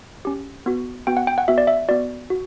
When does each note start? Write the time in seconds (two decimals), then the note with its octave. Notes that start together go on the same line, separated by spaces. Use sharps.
0.25 C#4 G4
0.66 B3 F#4
1.07 B3 F#4 G5
1.17 F#5
1.27 G5
1.38 F#5
1.48 B3 F#4 E5
1.58 D5
1.67 E5
1.89 B3 F#4 D5
2.30 F#4